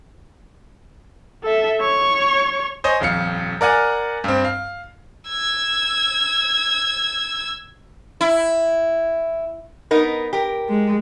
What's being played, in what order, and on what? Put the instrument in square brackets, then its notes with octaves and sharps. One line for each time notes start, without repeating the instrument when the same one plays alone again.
[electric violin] A4 E5
C#5 C#6
[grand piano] C5 C#5 D#5 G#5
D#1 F2 F5 C#7
A#4 D5 F#5 G#5
G2 C4
F5
[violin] E6 G#6
[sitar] E4
[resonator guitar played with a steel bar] B3 D#4 A#4
G4 A#4
[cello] G#3